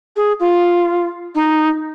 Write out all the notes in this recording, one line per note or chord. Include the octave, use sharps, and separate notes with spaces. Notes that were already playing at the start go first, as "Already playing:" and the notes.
G#4
F4
D#4